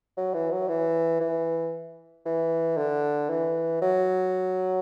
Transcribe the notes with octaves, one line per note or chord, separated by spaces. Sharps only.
F#3
E3
F#3
E3
E3
E3
D3
E3
F#3